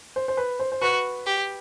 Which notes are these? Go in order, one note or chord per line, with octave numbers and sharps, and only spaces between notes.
C5
C5
B4
C5
C5
F#4 B4
G4